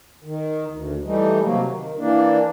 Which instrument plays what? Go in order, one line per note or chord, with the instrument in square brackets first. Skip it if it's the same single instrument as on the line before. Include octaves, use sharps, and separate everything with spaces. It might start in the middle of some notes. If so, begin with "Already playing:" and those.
[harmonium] D#3
D2
E3 G3 A3 D#4
C3 F#3 A#3
D#3
E3 A#3 D4